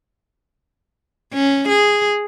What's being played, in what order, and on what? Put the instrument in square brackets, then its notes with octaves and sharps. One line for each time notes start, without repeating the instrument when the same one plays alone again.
[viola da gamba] C#4
G#4